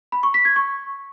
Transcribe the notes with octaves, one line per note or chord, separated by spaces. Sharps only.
B5
C#6
B6
G#6
C#6